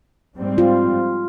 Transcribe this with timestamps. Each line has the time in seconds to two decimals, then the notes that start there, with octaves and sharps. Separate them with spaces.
0.37 G#2 G3 C4
0.58 F4